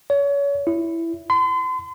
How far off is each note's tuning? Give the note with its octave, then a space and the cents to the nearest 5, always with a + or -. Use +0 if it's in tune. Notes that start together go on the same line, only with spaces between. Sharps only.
C#5 +30
E4 +10
C6 -40